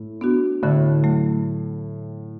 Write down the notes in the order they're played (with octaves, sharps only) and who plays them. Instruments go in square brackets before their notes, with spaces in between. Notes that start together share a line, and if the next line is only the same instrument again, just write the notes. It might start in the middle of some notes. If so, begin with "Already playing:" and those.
Already playing: [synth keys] A2
[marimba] B3 D4 F#4
[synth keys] A2 [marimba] D3
[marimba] F#3 A3